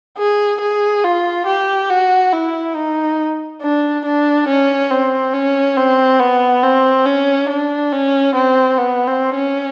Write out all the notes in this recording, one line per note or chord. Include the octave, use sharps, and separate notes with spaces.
G#4
G#4
F4
G4
F#4
E4
D#4
D4
D4
C#4
C4
C#4
C4
B3
C4
C#4
D4
C#4
C4
B3
C4
C#4